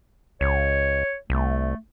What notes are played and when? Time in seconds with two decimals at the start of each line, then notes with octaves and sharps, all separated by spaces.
0.41 C#2 C#5
1.30 C2 A3